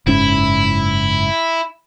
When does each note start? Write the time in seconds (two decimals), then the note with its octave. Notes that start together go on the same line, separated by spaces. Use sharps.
0.07 F#1 G#2 C#4 E4